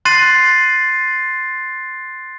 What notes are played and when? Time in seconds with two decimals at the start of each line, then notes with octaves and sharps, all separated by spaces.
0.05 C6 F#6 A6 C7 D#7